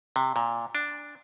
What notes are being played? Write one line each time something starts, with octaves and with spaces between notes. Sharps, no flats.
C3
A#2
D4